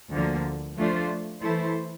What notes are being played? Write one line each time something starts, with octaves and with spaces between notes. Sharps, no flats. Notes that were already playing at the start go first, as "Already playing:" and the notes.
D2 D3 F3 A#3
F3 A3 D4 F4 C5
E3 A3 E4 A4 C5